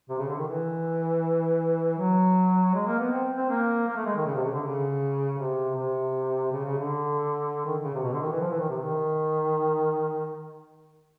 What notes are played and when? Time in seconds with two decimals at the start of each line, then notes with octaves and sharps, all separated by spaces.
0.09 C3
0.19 C#3
0.28 D3
0.38 D#3
0.47 E3
1.98 F#3
2.74 G#3
2.87 A#3
2.99 B3
3.11 C4
3.37 C4
3.49 A#3
3.87 A#3
3.96 A3
4.06 G#3
4.16 D#3
4.25 C#3
4.35 C3
4.44 C#3
4.53 D3
4.63 C#3
5.38 C3
5.76 C3
6.52 C#3
6.65 C#3
6.78 D3
7.65 D#3
7.84 C#3
7.94 C3
8.03 B2
8.12 D3
8.21 D#3
8.31 E3
8.41 F3
8.50 E3
8.59 D#3
8.69 C3
8.78 D#3